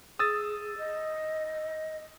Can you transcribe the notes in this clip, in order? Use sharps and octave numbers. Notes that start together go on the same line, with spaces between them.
G#4 D#6 E6 A6
D#5